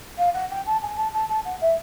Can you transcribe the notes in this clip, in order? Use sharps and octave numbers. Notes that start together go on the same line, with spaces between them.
F5
F#5
G5
A5
G#5
A5
A5
A5
F#5
E5